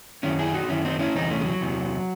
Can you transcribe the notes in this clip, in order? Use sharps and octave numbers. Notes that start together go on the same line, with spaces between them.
F#2 D#3 C#4 E4
E4 G#4
D#4 F#4
F#2 D#3 C#4 E4
C4 D#4
C#4 E4
E2 C3 E3 C4 D#4
A3 C#4
G#3
F#3
E2 C3 E3